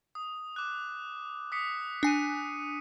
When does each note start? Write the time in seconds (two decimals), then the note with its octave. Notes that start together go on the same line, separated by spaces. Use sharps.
0.15 D#6
0.56 D6 F#6
1.52 D#6 B6 C#7
2.03 D4 G#5 C#7 D#7